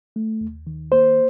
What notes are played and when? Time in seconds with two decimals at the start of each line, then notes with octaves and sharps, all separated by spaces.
0.16 A3
0.41 D#2
0.67 D#3
0.92 A#3 C5